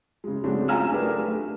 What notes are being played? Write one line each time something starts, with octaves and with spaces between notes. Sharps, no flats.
C#3 G#3
C#3 F#3 G#3 A3 C4 D4
F4 G#5 A#5 F6 E7
A3 D4 G4 G#4 A#4 B4
A3